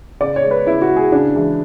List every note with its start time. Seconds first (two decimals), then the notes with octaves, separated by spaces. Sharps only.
0.21 C#3 D5
0.36 C#5
0.43 G#3
0.51 B4
0.66 C#3 E4
0.82 F#4
0.89 G#3
0.96 G#4
1.12 C#3 D4
1.35 E3 G#3